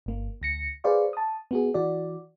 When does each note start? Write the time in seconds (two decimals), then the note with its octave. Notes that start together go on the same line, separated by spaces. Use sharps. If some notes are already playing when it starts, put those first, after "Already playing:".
0.06 G1 A#3
0.42 D2 A#6 C#7
0.84 G#4 B4 C5 D5 F5 C#6
1.13 A5 D#6
1.51 B3 F#4 G#4
1.74 E3 F#4 D5